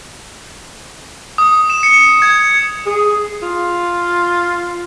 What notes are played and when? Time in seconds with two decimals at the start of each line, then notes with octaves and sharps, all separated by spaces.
1.38 D#6
1.70 E7
1.83 C#7
2.22 G#6
2.86 G#4
3.42 F4